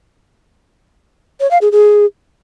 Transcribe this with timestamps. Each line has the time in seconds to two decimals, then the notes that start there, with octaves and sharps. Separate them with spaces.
1.40 C#5
1.51 F5
1.61 G#4
1.72 G#4